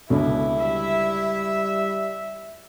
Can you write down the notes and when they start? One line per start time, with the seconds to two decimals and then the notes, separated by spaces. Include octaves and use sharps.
0.10 C#2 B2 D3 E4 A4
0.59 G3 E5